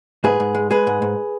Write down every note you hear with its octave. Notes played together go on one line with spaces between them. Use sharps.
G#2 G#4 B4
G#2
G#3
G#3 G#4 B4
G#2
G#2